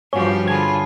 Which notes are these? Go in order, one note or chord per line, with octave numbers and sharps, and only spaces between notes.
G2 F3 C#4 F#4 G4 C#5
D3 F4 G#4 A5 B5 G#6